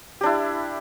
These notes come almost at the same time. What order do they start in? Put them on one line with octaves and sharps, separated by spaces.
G4 D4 E4